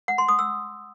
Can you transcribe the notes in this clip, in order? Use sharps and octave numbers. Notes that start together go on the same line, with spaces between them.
F#5
C6
D#6
E6